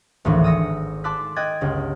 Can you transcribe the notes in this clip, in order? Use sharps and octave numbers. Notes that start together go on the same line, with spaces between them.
G#1 D2 A2 E3 F3
D#6 E6 A#6 C#7
A5 C6 D6 E6 F#6 B6
D#5 G5 F#6 G#6 A6
G1 C#2